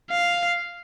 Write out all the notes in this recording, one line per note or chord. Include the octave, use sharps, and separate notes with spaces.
F5